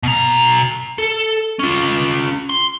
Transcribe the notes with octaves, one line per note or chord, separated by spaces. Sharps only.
B2 A#5
A4
C#4 F4
C6